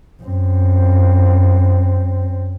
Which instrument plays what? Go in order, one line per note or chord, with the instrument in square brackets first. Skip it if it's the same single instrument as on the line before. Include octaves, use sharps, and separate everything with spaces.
[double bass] F#2 C4